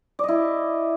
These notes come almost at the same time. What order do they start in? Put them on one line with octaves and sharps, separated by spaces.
D5 D#5 E4